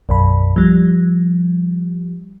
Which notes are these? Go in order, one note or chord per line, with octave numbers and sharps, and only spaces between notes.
B1 F#2 B5
F3 G3